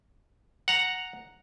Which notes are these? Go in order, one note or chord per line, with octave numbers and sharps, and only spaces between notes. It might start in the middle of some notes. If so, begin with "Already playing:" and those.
F#5 A#5